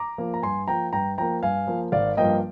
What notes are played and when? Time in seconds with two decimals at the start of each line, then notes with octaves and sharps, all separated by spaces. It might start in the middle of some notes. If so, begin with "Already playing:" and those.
Already playing: A#5 D6
0.18 F3 A#3
0.34 A#5
0.43 G2 G#5 C6
0.68 F3 A#3 G5 A#5
0.93 G2 G5 A#5
1.18 F3 A#3 G5 A#5
1.43 G2 F5 G#5
1.67 F3 A#3
1.92 G#1 D5 F5
2.17 G2 F3 A#3 D#5 G5